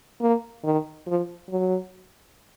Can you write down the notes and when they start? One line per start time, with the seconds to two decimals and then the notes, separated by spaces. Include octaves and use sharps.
0.21 A#3
0.64 D#3
1.07 F3
1.50 F#3